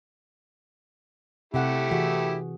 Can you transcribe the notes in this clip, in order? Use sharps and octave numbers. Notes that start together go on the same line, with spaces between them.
C3 A3 E4 G4 F#5
E3 F#4 G#4